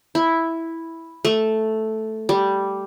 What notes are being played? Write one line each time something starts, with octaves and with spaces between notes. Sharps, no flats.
E4
A3
G3